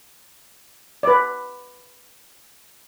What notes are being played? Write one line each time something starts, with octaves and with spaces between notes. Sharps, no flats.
B4 D5